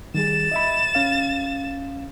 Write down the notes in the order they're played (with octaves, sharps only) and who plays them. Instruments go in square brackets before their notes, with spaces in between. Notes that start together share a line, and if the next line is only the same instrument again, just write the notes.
[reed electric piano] D#3 G3 G#4 [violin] A6 E7
[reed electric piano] D#5 E5 B5
C#4 F5